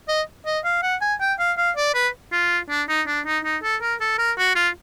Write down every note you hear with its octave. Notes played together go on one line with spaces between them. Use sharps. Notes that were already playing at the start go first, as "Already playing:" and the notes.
D#5
D#5
F5
F#5
G#5
G5
F5
F5
D5
B4
F4
D4
D#4
D4
D#4
D#4
A4
A#4
A4
A#4
F#4
F4